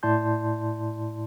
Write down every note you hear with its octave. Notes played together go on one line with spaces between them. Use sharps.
A2 E4 D5 A5 C6 G6